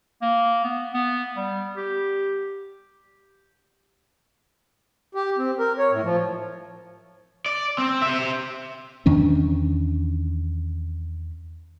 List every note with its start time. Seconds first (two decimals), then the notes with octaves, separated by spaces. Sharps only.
0.22 A#3
0.64 B3
0.93 B3
1.37 G3
1.77 G4
5.15 G4
5.38 C4
5.59 A#4
5.78 C#5
5.91 A2
6.03 F3
7.46 D5
7.78 C4
8.02 C5 E5
9.06 E2 D#3 C#4 D4